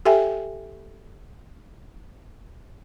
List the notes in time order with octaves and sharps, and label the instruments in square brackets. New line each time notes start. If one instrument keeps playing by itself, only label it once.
[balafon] G4 A4 E5 G5 G#5